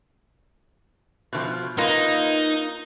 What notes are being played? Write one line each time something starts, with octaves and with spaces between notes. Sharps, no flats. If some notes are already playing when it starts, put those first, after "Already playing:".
B2 E3 F3
A#3 D#4 F4 B4